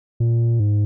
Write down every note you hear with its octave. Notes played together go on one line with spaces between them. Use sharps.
A#2
G#2